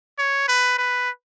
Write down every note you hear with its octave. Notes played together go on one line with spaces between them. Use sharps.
C#5
B4
B4